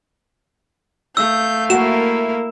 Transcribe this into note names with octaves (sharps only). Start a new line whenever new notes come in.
A3 F5 E6 G6
A#3 E4 F#4 A#4 E7